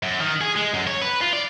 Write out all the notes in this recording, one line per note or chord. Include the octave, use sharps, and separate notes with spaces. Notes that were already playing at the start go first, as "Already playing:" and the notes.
F#2
D#3
G#4
G#3
F#2
C#5
B4
F4
D5